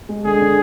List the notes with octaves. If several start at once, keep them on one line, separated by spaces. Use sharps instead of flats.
G#3
D3 G#4
D3